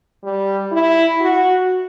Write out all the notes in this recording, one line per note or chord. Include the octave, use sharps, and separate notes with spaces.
G3
E4
F#4